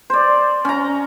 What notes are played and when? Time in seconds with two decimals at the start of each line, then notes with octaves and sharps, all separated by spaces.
0.10 C5 D5
0.65 C#4 A#5